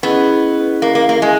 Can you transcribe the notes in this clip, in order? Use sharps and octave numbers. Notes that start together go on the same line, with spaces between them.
B3 C#4 E4 G#4 D#5
A#3
A#3
A#3
G#3